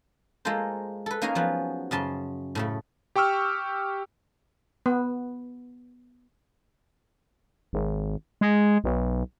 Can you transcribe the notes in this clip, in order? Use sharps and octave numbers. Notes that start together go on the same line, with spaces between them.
G#3 A#3 F4 A4 C5
A4 B4
A#3 C#4 D#4 G#4 A#4 F5
F3 F#3 B3
F#2 C#3 A5 C6
A2 C#3 A3
G4 G5 C#6 E6 F6
B3
G#1
G#3
B1